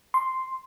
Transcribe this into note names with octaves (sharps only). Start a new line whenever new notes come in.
C6